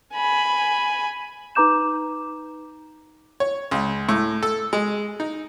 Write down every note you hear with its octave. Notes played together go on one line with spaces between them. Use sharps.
G#5 B5
D#4 B4 A#5 D6 G6 E7
C#5
C#2
A2
A4
G#3
D#4